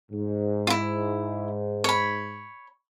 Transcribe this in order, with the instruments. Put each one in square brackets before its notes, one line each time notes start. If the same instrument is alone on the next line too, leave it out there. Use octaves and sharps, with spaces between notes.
[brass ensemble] G#2
[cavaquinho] E4 F4
C#5 B5